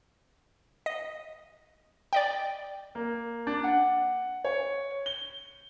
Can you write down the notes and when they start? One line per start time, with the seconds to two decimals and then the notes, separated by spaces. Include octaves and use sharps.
0.86 D#5
2.13 D5 D#5 G5
2.95 A#3
3.47 D4
3.64 F#5
4.45 C#5
5.06 G7